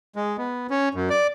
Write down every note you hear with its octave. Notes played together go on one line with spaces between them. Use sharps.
G#3
B3
C#4
F#2
D5